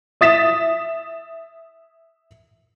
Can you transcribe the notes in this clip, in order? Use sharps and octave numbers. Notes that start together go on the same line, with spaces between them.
E5 D#6 A6 B6 E7